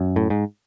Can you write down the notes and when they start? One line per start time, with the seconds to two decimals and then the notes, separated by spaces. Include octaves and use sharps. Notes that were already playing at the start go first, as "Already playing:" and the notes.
Already playing: F#2
0.16 A2
0.30 G#2